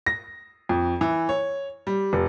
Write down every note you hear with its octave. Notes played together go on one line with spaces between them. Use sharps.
A#6
F2
E3
C#5
G3
F1